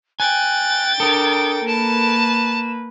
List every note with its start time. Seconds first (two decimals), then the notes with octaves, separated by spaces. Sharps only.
0.20 G5 G#5 F#6 A6
1.00 D4 A4 A#4 D#6
1.67 A#3 B4 A5 E7